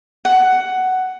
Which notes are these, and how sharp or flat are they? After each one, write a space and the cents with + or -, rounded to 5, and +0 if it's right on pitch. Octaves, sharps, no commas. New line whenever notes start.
F#5 +10